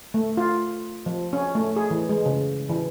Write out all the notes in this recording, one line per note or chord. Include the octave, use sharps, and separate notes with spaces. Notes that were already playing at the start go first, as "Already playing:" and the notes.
A3
F4
F3
C#4
A3
G#4
E3
G#3
C#3
E3